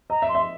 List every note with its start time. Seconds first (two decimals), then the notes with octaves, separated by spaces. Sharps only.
0.10 D#5 A#5
0.22 E5
0.29 C6
0.35 E5